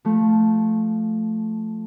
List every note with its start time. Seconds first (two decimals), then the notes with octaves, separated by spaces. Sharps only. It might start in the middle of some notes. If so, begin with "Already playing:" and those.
0.05 F3 A3